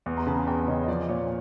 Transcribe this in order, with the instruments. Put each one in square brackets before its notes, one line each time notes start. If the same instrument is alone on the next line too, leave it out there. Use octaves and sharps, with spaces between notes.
[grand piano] E2
[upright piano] A#5 C6
[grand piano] C#3 [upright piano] A5 B5
[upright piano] G#5 A#5
[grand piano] E2 [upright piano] G5 A5
[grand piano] C#3 [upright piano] C#5 D#5
[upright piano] D#5
[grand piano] F3 [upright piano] D5
[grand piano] A#2 [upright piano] C#5